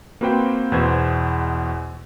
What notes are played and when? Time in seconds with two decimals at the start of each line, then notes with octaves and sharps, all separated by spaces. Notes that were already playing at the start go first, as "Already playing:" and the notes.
0.21 A#3 C4 F#4 B4 C5 G5
0.72 E2 B2 B4 C5 E6 G#6